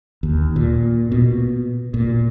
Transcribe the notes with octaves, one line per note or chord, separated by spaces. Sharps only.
D#2
A#2
B2
A#2